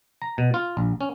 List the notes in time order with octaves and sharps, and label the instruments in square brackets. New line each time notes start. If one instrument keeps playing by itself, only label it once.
[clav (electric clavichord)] A#5
B2
F4
A#1
C#4